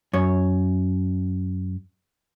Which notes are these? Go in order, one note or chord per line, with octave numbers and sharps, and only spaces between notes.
F#2 C#5